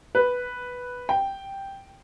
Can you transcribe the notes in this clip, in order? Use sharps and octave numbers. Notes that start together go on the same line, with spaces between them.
B4
G5